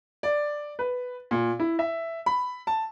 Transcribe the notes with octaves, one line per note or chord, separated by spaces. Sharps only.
D5
B4
A#2
E4
E5
B5
A5